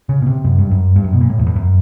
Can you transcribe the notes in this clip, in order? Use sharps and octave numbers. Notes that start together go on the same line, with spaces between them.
C#3
B2
C3
F#2
G2
F#2
G2
F#2
B2
A#2
A2
E2
F2
F#2